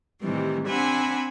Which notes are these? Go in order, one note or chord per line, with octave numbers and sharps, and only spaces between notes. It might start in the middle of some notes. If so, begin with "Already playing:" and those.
A2 C3 D#3 E3 G3
C4 D4 E5 F#5 G#5 B5